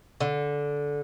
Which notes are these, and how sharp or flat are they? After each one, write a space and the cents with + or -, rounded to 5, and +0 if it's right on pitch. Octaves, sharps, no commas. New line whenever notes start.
D3 -15